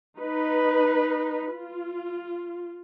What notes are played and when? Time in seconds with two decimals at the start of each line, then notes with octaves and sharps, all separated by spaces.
0.19 D#4 B4
1.53 F4